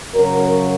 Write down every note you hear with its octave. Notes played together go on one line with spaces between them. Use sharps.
F#2 C#3 F#3 A#4